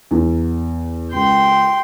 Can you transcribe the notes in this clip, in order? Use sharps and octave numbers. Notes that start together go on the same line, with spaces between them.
E2
C#2 G5 C6